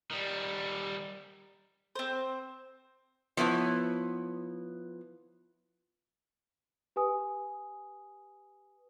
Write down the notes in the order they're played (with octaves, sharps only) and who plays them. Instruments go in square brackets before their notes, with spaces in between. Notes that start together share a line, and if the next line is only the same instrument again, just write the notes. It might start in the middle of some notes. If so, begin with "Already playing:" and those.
[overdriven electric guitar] D#3 G3
[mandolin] C4 C5
[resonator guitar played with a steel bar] F3 B3 E4 C#5
[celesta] G4 B4 G#5 D#6